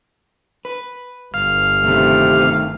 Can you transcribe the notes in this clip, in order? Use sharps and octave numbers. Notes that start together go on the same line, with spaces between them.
B4
G1 F5
C3 D#3 A3